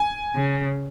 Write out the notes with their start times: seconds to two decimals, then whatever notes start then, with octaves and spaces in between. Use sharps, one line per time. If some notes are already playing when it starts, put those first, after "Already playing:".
Already playing: G#5
0.36 C#3